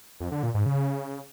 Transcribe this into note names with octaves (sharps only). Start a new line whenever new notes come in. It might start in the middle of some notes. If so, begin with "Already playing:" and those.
F2
D3
A#2
G#2
C#3